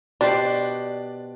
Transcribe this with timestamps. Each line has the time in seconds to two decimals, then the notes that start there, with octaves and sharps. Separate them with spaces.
0.21 B2 D4 G4 C5 D5 F#6